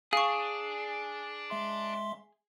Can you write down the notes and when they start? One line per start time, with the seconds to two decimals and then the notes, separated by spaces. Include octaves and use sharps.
0.13 D4 G#4 F5 C#6
1.50 G#3 E5 C6